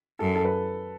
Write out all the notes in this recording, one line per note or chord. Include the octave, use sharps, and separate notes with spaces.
F#2 A4
A4
B4